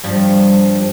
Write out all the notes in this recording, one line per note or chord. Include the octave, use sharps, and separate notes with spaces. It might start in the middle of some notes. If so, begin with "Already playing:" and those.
G2 F3 G3